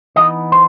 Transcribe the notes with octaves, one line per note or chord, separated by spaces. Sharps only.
E3 B3 D#4 D#5
C5